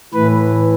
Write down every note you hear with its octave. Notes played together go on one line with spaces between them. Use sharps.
A2 E3 B4